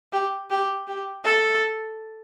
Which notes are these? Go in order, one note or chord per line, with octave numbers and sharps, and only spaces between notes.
G4
G4
G4
A4